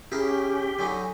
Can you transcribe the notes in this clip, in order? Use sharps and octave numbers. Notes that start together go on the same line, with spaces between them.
C#4 E4 G4 G#4 A#4
D3 F#3 D#4 G#5